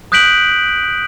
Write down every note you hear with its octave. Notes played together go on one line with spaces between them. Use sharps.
D#6 F#6 G6 B6 D7 F#7